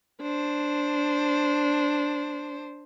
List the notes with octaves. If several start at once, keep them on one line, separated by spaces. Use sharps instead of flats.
D4 C5